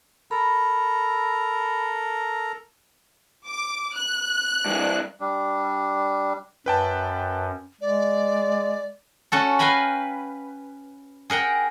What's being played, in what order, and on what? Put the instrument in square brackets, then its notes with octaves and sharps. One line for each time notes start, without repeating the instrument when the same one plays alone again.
[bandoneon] A4 A#4 A#5 [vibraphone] B5
[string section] D6
F#6
[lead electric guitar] G2 E3
[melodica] G3 D4
[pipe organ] F#2 [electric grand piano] B4 G5 A5
[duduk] G#3 [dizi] D5
[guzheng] C#4 F#4 A4
B4 F5 G5 G#5 A#5 B5
G#4 A#4 F#5 G5